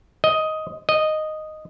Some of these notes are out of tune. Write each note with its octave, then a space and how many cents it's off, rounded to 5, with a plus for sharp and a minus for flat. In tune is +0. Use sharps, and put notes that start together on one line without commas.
D#5 +10
D#5 -5